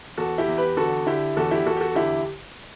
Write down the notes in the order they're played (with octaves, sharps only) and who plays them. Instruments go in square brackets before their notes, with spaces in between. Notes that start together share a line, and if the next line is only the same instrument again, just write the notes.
[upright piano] E2 F#4 A4
E4 G4
E2
G4 B4
D3 F#4 A4
D3 E4 G4
E2 F#4 A4
E4 G4
E2 F#4 A4
G4
F#4 A4
D3 E4 G4